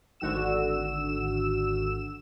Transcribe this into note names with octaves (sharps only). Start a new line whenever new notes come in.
G#1 D3 F#4 E6 E7